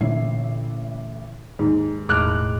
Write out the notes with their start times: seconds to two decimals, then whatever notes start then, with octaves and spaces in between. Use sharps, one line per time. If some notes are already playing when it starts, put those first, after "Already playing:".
0.01 A1 A#2 D3 E5 C7
1.59 D#2 G#2
2.09 E1 A2 G#3 D6 F6 F#6